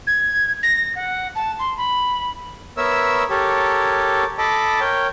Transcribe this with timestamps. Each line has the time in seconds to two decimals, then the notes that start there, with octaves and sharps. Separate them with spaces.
0.07 G#6
0.63 A#6
0.95 F#5
1.35 A5
1.59 C6
1.77 B5
2.77 B3 A#4 C#5 E5 E6
3.30 G4 A4 A#4 C#5
4.38 A4 D#5 A5 B5 D6
4.80 A#4 C#5 G5